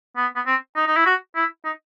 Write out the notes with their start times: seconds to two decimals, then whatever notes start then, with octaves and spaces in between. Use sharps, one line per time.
0.16 B3
0.36 B3
0.46 C4
0.76 D#4
0.87 D#4
0.96 E4
1.06 F#4
1.36 E4
1.65 D#4